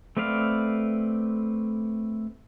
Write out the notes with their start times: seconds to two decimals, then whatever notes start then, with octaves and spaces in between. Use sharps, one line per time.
0.17 A3 C4 B4 D5 F5